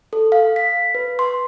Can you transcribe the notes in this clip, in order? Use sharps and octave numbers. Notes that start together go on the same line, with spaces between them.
A4
F5
B6
B4
C6